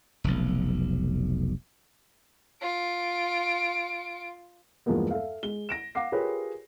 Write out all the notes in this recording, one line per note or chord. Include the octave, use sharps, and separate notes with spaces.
F1 B1
F4 D7
E2 G2 F3 G#3 A#3 B3
A4 E5 F5
G#3 G7
A#6 D7 E7
F5 F#5 D6 C7
F4 G4 G#4 A#4 B4 C#5